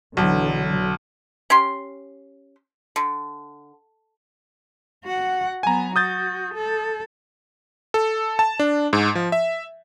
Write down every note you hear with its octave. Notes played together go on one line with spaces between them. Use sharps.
B1 D3 E3 F#3
C#4 G4 C6
D3
F#4 F#5
F#3 B3 G#5 A#5
F#4 D#6 G6 A6
A4
A4
A5
D4
G#2
F3
E5